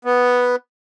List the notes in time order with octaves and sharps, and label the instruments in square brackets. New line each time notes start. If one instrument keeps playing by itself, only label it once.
[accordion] B3